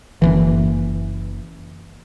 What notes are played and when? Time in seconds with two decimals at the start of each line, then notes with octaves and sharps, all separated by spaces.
0.22 F#1 C#2 E3